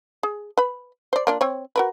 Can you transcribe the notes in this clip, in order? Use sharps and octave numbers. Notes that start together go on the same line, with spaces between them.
G#4
B4 B5
C5 D5
A#3 D4 F4
C4 C#5
F#4 A#4 B4